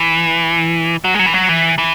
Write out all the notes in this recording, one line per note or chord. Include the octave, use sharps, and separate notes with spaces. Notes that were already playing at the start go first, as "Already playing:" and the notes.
Already playing: E3
F#3
G#3
F#3
E3
F#3
E3
E3